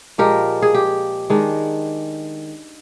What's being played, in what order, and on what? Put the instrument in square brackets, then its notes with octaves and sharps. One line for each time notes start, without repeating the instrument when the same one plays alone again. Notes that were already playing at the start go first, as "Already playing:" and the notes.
[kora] A#2 F3 G#3 G4 A#4
G#4
G4
D#3 G#3 D4